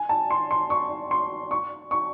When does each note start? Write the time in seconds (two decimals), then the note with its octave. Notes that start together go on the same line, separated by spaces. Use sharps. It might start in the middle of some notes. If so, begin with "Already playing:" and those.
Already playing: G#5
0.09 A5
0.31 C6
0.51 C6
0.70 C#6
1.11 C6
1.51 C#6
1.91 C#6